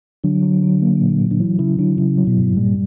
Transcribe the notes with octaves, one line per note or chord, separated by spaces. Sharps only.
D3 F#3
F#3
F#3
A#3
A#2
A#2
D3
E3 F#3
C#3 E4
D3 F#3
C#3 E4
F#3
B2
G2
A#2 G3